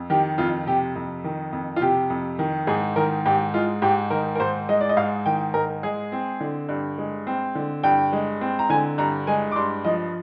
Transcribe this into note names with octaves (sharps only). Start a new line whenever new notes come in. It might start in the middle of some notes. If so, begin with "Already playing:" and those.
Already playing: F2
D#3 G4
F2 F4
C3 G4
F2
D#3
F2
F4
C3 G4
F2
D#3
G#2 G#4
D#3 A#4
G#2 G4
G#3 F4
G#2 G4
D#3 A#4
A#4
G#2 C5
G#3 D#5
D5
D#5
G#2 F5
D#3 G5
G#2 A#4
G#3 G#4
C4
D3
G2
G#3
C4
D3
G2 G5
G#3
C4
A#5
D3 G#5
G2 A#5
G#3 G#5
D6
G2 C6
F3 D#5